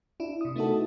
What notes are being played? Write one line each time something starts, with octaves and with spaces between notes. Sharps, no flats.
D4 E4
C3 D#6
A3 B3 D#4 E4 F#4 A4